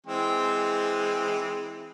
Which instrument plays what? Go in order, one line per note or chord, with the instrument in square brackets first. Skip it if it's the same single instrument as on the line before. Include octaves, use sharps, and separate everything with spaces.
[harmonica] E3 G#3 C4